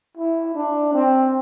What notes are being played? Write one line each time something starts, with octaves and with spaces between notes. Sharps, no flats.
E4
D4
C4